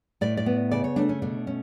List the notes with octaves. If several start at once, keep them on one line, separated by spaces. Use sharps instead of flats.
A2 D5
D5
B3
C#3 D5
C#5
A3 D4
C#4
B2 D4
C#4